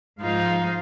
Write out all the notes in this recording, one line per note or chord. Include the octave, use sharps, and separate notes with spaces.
G#2 F3 D#4 F4 F5